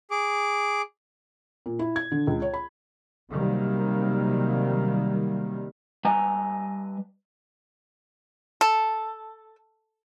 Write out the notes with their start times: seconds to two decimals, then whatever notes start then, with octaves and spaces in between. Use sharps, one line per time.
0.11 G#4 D6
1.66 A#2
1.79 E4
1.96 G#6
2.12 D3
2.27 C#2
2.42 C#5
2.54 B5
3.32 C3 D#3 F#3 G3 A#3
6.05 G3 B4 D#5 G#5 A#5
8.61 A4